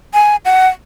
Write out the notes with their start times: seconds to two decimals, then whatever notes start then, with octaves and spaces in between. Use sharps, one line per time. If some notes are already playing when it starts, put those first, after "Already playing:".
0.14 G#5
0.45 F#5